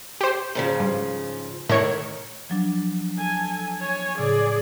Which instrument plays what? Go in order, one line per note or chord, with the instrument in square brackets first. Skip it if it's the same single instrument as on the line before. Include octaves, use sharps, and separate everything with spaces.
[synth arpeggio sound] G4 C5
[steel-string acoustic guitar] G#2 C#3 F3
[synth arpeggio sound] G2
[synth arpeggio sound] A2 C#5 C#7 [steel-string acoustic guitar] D#3
[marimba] F3 F#3 D4
[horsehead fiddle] A4 G#5
C#5 G#5
[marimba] A2 C#3 [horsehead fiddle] G#4 D5